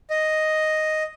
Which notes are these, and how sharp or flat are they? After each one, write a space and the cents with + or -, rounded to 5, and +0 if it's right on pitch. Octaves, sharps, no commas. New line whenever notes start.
D#5 +0